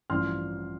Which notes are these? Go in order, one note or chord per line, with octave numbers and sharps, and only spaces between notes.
A1 G2 F3 C6 F6